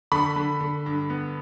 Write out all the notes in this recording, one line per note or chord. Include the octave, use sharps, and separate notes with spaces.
D3 B5
D3
D3
G2
B3